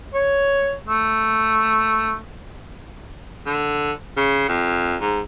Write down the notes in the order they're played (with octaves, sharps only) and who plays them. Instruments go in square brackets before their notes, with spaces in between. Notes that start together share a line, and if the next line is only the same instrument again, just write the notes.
[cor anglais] C#5
A3
[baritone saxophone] D3
C#3
F2
G#2